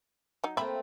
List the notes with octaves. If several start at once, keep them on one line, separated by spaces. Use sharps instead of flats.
F#3 D#4
A3 A#3 C4 E5 B5